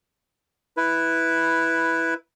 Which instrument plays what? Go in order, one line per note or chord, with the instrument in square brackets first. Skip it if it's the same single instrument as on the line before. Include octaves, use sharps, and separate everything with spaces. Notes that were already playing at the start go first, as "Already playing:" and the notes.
[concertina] E4 B4